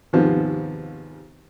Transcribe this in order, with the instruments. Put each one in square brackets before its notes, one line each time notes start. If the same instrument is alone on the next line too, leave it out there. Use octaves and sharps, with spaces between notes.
[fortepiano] D#2 G#2 C3 F3 B3